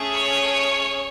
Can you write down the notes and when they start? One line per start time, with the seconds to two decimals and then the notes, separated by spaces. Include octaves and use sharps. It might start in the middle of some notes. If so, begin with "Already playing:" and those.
Already playing: A3 C#4 G#4
0.11 C#5